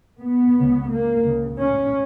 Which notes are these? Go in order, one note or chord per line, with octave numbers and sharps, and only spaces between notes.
B3
C#2 C#3
A#3
C#2 C#3
C#4